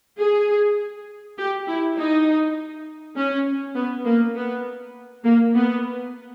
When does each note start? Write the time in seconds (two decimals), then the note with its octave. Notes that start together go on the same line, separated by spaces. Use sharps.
0.18 G#4
1.38 G4
1.67 E4
1.97 D#4
3.16 C#4
3.75 B3
4.05 A#3
4.35 B3
5.24 A#3
5.54 B3